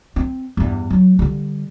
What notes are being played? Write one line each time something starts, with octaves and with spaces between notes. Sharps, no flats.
C4
E2 G2
F#3
D3 G3